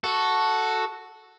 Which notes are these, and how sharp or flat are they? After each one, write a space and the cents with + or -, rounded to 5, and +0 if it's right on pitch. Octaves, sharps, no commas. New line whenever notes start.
F#4 +0 A4 +0